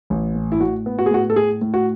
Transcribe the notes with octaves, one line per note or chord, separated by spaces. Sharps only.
A1
A2
E4
A2 F#4
B3
F#4
G#4
A2 F#4
A4
A2 G#4
A2
F#4